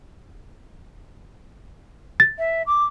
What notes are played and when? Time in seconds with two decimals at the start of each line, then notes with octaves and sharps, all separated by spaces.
2.20 A6
2.38 E5
2.67 D6